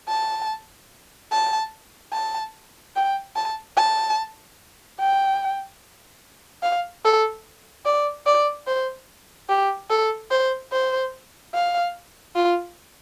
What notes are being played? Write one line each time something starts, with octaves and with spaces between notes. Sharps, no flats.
A5
A5
A5
G5
A5
A5
G5
F5
A4
D5
D5
C5
G4
A4
C5
C5
F5
F4